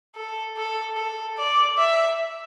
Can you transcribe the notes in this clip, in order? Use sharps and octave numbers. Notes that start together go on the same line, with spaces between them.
A4
A4
A4
D5
E5